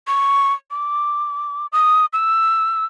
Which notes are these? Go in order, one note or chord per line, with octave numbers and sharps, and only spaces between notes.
C#6
D6
D#6
E6